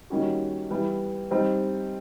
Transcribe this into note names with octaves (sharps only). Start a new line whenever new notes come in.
D#3 G3 A#3 C#4 F#4
E3 G3 B3
G3 C4 D#4